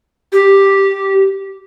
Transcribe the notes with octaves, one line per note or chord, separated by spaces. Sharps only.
G4